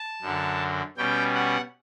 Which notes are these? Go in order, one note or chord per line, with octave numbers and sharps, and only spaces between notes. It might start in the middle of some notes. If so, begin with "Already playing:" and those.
Already playing: A5
F#2 D3 F#3
B2 G3 C#4 G5
F#5